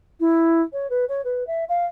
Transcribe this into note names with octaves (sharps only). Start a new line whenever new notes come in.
E4
C#5
B4
C#5
B4
E5
F5